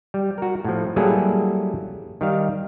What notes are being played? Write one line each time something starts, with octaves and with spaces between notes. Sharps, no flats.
G3
F#4 A#4
A2 F3
F#3 G3 A#3 E4 G#4 A4
D#3 G3 F5